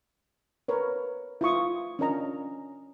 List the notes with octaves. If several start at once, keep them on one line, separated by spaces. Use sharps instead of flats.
A#4 B4 C#5
E4 F4 C#6 D#6
C#4 D4 F4 A#4 D#5 A#5